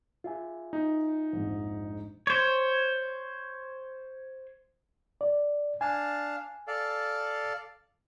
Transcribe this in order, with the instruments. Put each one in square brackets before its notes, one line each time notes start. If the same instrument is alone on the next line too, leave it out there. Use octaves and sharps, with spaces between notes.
[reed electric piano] F4 E5 G#5 [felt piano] G#4
[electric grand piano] D#4
[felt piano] A#1 F2 G#2
[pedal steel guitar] C5 C#5
[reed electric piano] D5
[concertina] D4 F5 A5 [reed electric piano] G#5
[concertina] A4 D5 F5